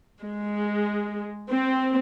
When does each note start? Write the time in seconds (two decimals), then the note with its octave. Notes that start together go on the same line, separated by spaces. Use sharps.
0.24 G#3
1.49 C4